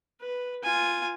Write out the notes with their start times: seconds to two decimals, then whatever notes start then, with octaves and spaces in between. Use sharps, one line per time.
0.21 B4
0.63 F4 G#5